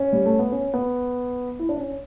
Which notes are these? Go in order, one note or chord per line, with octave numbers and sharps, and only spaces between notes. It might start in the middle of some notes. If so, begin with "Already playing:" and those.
Already playing: C#4
G3
A3
B3
C#4
B3
E4
D4
C#4